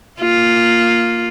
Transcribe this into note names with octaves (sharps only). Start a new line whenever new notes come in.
A#3 F4